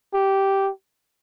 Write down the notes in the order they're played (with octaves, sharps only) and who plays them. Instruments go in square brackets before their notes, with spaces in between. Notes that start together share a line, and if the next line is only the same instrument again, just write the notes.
[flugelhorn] G4